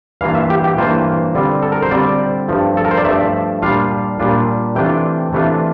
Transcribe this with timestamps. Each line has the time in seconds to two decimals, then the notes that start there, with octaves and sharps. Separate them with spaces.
0.21 G2 E3 A#3 F4 F5
0.35 E5
0.50 G4
0.64 G4
0.78 G2 E3 A#3 F4 C5
1.35 D3 G3 C4 F4
1.62 A4
1.72 A#4
1.82 C5
1.91 D3 G3 C4 F4 D5
2.48 G2 F3 A3
2.77 A4
2.85 A#4
2.91 C5
2.98 D5
3.05 G2 F3 A3 E5
3.62 A#2 G3 D4 F4 F5
4.19 A#2 G3 D4 F4
4.75 C3 E3 A3 D4 F4 G5
5.33 C3 E3 A3 D4 F4